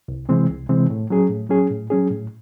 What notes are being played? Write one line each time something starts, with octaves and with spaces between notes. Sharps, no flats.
C2
C3 E3 G#3 C4
C2
C3 E3 G#3 C4
A2
F#3 C#4 G#4
A2
F#3 C#4 G#4
A2
F#3 C#4 G#4
A2